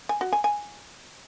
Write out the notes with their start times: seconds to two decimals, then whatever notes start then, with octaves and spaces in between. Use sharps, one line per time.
0.09 G#5
0.21 F#4
0.33 G#5
0.44 G#5